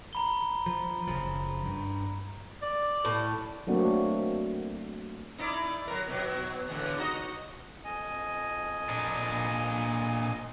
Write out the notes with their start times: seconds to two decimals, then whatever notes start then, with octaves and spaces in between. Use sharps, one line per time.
0.13 A#5 B5 G7
0.66 F3
1.08 F#1 C#3 F3
1.66 G2
2.62 D5
3.05 A2
3.67 F#3 A3 A#3 C4 D4 F#4
5.38 D#4 E4 D5
5.88 F#3 A#4
6.08 B2 F#3
6.68 E2 A2 D3
6.98 D#4 F#4 D#5
7.84 F2 D#5 G#5
8.89 A#2 D4